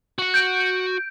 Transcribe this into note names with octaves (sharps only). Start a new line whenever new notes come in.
F#4 F#5
G6 D7